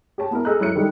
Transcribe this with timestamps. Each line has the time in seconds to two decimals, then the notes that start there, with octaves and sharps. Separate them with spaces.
0.18 G4 C#5 A5
0.31 B3 E4 A#4
0.45 G#4 A4 D#5 A#5 F6 F#6
0.60 F#2 E4 C#5 F#6 C#7
0.75 D#3 G3 D#4 G4 A4